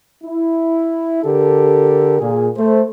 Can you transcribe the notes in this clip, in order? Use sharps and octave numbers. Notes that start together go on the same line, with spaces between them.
E4
D3 G4 A4 A#4
A#2 G#4
A3 C5